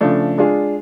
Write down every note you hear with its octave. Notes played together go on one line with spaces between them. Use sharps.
C#3 F3 A3 D4
G#3 D4 F4 G#4